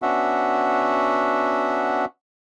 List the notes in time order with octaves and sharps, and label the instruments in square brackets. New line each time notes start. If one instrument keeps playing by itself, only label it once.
[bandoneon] B3 C#4 D4 F#4 E5 F#5